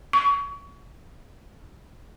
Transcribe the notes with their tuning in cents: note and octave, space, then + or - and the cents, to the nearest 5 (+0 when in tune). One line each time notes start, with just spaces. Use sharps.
C#6 +25